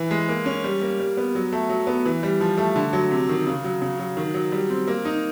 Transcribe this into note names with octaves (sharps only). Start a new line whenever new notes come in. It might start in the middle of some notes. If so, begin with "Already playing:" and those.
Already playing: E3
G#3
A#3
C#4
G3
A#3
G3
B3
F#3
A3
F#3
B3
E3
G3
F3
A3
D3
F#3
C3
D#3
C#3
F#3
C#3
F#3
D#3
F#3
G3
C4
A#3
D#4